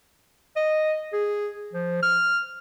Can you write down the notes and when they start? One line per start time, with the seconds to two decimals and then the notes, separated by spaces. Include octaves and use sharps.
0.56 D#5
1.13 G#4
1.73 F3
2.03 F6